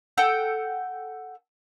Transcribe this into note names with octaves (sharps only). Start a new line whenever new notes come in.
A4 F#5 G5 E6